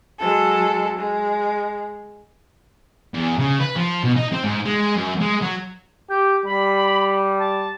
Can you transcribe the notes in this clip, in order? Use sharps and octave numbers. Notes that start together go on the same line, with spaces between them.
F#3 G#3 A4
G#3
E2
C#3
B4
F3
B2
D#4
C4
G#2
G#3
F#2
G#3
F#3
G4 G6
G3 B5
A5